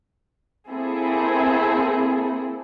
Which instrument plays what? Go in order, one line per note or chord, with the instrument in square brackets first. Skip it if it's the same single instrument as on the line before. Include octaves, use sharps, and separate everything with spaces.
[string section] A#3 C4 E4 G#4 A4